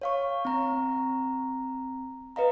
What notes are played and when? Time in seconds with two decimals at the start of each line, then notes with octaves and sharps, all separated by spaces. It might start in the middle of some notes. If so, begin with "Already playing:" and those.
0.02 C#5 F5 C#6
0.45 C4 A#5
2.36 B4 D#5 F5 A#5